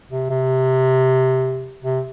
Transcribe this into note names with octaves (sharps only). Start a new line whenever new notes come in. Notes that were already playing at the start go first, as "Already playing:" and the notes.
C3
C3
C3